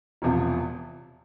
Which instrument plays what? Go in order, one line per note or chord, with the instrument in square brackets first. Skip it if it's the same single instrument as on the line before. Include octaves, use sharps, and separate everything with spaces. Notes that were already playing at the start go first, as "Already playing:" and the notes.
[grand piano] E1 E2 C3 F3